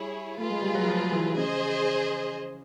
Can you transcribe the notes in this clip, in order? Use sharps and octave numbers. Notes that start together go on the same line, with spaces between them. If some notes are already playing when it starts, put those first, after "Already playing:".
Already playing: G3 E4 G#4 C#5
A3 F4 G#4 B4
G#3
G3
F#3
F3
E3
C#3 G#4 C5 D#5